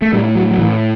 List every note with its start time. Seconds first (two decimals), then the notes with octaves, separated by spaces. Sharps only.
0.02 A3
0.13 A2 G3
0.35 F#3
0.51 F#3
0.58 A2 E3